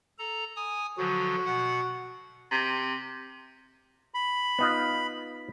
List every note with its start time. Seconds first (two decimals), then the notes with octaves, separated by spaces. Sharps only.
0.19 A4 A#5
0.56 G#5 D#6
0.98 D3 F3 F#3 F#4
1.46 B2 F#5
2.51 C3
4.14 B5
4.59 B3 D#4 F4